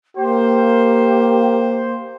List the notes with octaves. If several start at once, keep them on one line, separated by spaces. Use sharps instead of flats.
A#3 G4 C5